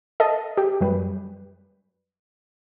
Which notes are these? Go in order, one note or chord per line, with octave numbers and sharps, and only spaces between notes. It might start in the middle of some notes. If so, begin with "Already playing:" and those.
A4 D#5 A5
G4
F#2 G3 B4